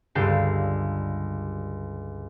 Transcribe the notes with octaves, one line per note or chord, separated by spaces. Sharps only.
C#2 G2 D3 G4 G5 C7